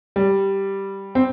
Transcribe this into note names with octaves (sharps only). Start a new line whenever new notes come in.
G3
C4